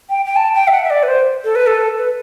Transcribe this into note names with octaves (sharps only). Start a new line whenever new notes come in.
G5
G5
A5
G5
E5
F#5
E5
D5
B4
C5
A4
B4
A4
B4